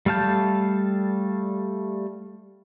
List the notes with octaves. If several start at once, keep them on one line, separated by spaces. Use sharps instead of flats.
G3 A3 F5 A5 G6